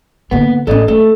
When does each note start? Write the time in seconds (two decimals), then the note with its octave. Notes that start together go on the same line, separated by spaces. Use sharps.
0.31 D3 A#3 B3
0.67 A1 C#4 A4 D5 D#5
0.88 A3 A4